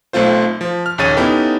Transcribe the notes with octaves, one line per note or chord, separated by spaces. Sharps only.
B1 A3 C4 F4 C5
F3
F6
A#1 D#2 C#3 C#5 A6 D#7
B3 C#4 D#4 E4 G4 A4